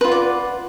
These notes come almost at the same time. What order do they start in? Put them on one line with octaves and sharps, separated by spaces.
B4 F4 F#5 D5